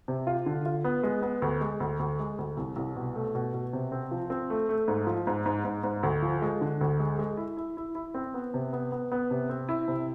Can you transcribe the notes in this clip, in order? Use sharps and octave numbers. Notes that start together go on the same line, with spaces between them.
C3
F4
D3
F4
B3
G#3
B3
D2
G#3
D2
D2
G#3
D2
C2
C2
B2
A3
B2
B2
C3
C4
F3
C4
A3
A3
G#2
F3
G#2
G#2
G#2
G#2
D2
F3
G#3
D3
D2
G#3
G#3
E4
E4
E4
E4
C4
B3
C3
B3
B3
B3
C3
C4
E4
C3